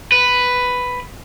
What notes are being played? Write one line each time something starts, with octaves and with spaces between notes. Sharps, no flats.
B4